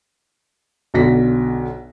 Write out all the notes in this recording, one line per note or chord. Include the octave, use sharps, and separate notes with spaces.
B1 B2 D3 A#6 B6